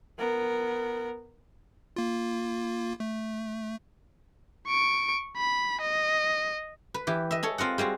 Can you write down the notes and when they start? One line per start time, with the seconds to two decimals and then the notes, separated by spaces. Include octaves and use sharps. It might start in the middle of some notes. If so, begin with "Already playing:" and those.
0.18 B3 A#4
1.96 A#3 F4
3.00 A3
4.67 C#6 D7
5.37 B5
5.81 D#5
6.94 B4
7.07 E3 G4
7.31 D#5 E5
7.43 G#4 A4 C#5
7.58 C4 F4 D#5 F#5
7.78 G3 G#3 C4 F#4